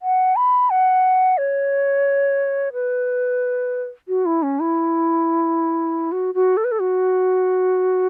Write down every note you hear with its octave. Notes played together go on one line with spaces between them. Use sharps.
F#5
B5
F#5
C#5
B4
F#4
E4
C#4
E4
F#4
F#4
A4
B4
A4
F#4